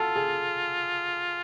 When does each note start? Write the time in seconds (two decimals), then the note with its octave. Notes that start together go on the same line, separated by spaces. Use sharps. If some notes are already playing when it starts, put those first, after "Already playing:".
Already playing: F4 F#4 A4
0.16 G#4